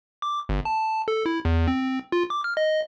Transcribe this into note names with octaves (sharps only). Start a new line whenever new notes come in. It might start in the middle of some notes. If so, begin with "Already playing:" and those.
D6
G1
A5
A4
E4
E2
C4
F4
D6
F6
D#5